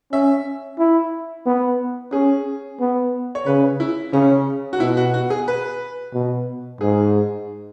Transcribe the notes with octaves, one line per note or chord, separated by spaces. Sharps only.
C#4 E5
E4
B3
C#4 G#4
B3
C#5
C#3 B4
E4
C#3 C#4
F#4
B2 E4
F#4
F#4
G#4
B4
B2
G#2 G#4